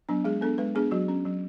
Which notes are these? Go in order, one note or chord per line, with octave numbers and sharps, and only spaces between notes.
F#3 B3 D4
G#3 G#4
B3 D4 A4
G#3 B4
B3 D4 G#4
F#3 F#4
C#4
F#3